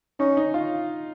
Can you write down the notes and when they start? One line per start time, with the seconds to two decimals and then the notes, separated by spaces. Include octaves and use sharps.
0.20 C#4 D#4
0.37 D#4
0.54 F4